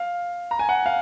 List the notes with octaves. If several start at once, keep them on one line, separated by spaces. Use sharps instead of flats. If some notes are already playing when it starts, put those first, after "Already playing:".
Already playing: F5
A#5
G#5
F#5
F5